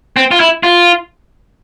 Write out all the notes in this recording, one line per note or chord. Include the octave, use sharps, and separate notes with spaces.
C4
F4
E4
F4